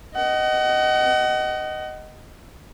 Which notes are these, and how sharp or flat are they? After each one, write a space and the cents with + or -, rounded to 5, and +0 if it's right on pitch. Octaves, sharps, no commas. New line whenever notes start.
D#5 +0 F#5 +35